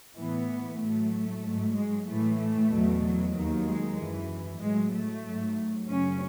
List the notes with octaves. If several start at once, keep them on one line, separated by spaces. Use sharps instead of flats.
A2 E3 B3
A2 F#3 A3
G#2 F#3
G#3
A2 E3 A3
A3
E2 B2 F#3
F#3
D#2 D#3 F#3
G#3
F#2 E3
A2 F#3 G#3
A3
G#2 F#3
F#2 C#3 F#3 C#4